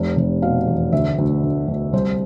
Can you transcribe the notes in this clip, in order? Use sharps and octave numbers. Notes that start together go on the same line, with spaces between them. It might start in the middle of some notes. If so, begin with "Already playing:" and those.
Already playing: F1 C3
F1
B2 F5
E2
D2 E5
D2
D3
D2
C2 C5